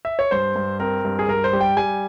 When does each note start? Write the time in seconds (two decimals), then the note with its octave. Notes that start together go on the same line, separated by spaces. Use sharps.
0.05 E5
0.19 C#5
0.31 G2 C5
0.56 G2
0.80 C4 A#4
1.05 G2
1.19 G#4
1.28 G2 A#4
1.44 C5
1.53 G3
1.61 G5
1.77 G3 G#5